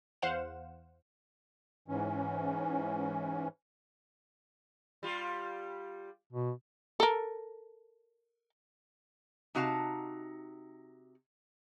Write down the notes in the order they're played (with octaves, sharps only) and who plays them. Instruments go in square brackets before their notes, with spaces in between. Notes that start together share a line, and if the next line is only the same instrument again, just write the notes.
[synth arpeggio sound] E2 C5 F5 F#5 E7
[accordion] G#2 E3 C#4
[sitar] G3 F4
[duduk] B2
[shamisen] A4 A#4
[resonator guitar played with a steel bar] C3 D#4 F#4 F5 A5 A#5